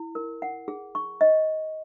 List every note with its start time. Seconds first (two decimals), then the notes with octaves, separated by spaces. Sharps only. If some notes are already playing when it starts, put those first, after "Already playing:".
Already playing: E4
0.15 A#4
0.42 F#5
0.68 G#4
0.95 C#6
1.21 D#5